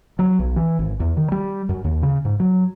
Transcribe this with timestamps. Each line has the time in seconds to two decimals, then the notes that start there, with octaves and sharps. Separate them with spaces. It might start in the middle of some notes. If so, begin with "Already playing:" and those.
0.19 F#3
0.39 B1
0.56 E3
0.79 G#1
1.00 E2
1.17 D#3
1.32 G3
1.69 F#2
1.84 D#2
2.02 C#3
2.25 G#2
2.40 F#3